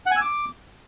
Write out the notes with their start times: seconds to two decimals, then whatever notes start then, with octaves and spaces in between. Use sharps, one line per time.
0.06 F#5
0.11 G#5
0.16 E6
0.21 D6